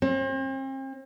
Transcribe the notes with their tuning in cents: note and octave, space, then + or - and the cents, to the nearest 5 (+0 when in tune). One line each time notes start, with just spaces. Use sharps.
C4 +40